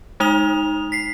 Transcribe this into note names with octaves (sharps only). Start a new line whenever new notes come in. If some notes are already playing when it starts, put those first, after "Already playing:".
G#3 D#4 D#6 F7
B6 C7